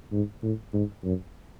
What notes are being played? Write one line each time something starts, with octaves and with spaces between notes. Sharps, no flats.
G#2
A2
G#2
F#2